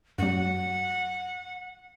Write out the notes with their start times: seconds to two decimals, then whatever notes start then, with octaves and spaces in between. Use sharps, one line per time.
0.18 F#2 F#3 F#5